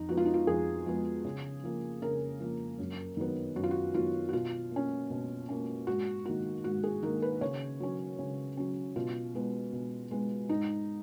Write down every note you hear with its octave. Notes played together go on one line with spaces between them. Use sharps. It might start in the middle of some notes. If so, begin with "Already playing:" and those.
Already playing: F2 D#4
F3 G#3 B3 F#4
F4
D#4
F4
F2 G#4
F3 G#3 B3
C#3
F3 A#3
C#3 A#4
F3 A#3
F#2
D#3 F#3 B3
F#2 F#4
F4
F#4
D#3 F#3 B3 F4
F#4
B2 F4
A#3 C#4
B2
A#3 C#4
G#2 F#4
D#3 A#3 F#4
G#2 F#4
G#4
D#3 A#3 A#4
B4
C#3 C#5
F#3 C#4
C#3
F#3 C#4
B2 F4
G#3 B3
B2
G#3 B3
G#2 D#4